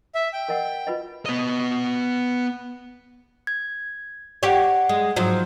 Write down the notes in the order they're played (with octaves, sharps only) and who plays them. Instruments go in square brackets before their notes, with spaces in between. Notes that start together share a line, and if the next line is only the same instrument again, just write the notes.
[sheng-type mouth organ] E5
G5
[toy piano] A#4 D#5 F#5
F4 B4 D#5
[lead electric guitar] B3 D#5
[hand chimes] G#6
[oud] G4 C#5 [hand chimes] D5 F#5
[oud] G#3
G#2 F3 F#3